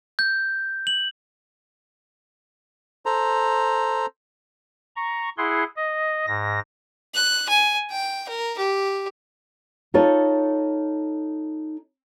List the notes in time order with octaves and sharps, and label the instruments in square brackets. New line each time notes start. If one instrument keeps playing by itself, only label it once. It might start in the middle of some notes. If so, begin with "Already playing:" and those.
[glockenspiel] G6
F#7
[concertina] A4 C5 A#5
[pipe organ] A#5 C#6
E4 G#4 F#5 C6
D#5
G#2 A#6
[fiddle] F#6
G#5
G5
A#4
G4
[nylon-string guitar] D#4 F4 A4 C#5